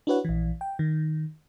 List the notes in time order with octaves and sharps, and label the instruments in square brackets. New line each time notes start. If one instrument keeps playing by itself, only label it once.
[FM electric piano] D4 E4 F#4 B4 C#5 F#5
A#1 E3
G5
D#3